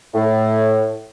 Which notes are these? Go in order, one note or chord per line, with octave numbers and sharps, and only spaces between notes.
A2